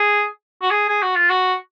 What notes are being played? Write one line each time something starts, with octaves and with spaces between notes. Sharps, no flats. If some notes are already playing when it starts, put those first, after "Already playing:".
Already playing: G#4
F#4
G#4
G#4
F#4
F4
F#4